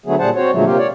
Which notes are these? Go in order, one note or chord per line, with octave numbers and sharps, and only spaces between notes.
D3 F#3 A3 B3 G#4
A#2 G3 G#4 C5 F#5 A5
C4 F#4 C5 C#5
A#2 D3 F3 F#3 G#3 A3
C3 A#3 F4 G4
C#5 D5